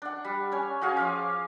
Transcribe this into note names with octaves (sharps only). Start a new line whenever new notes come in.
D4 F#5
G3
C#4 C#5 G#5
C#4 F#4 G#4 F5
F3 F5 D6